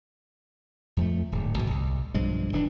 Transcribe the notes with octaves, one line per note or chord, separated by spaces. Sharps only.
F2 F3 A3
D1 G#2
G#1 B2
C2
B1 G2 F3 G#3
D#1 E3 D4